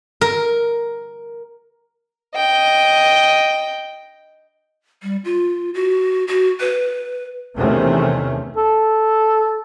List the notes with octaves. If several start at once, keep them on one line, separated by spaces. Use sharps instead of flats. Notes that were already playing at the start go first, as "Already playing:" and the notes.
A#4
D#5 G5
G3
F4
F#4
F#4
B4
E2 C3 D#3 A3 C4 C#4
A4